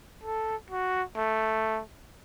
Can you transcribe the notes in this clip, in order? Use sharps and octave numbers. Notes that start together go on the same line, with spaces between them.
A4
F#4
A3